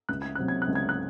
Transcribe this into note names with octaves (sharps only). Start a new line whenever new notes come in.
C#2 F#6
G#6
C3 F#3 C4 F#6
G#6
F#6
C#2
G#6
F#6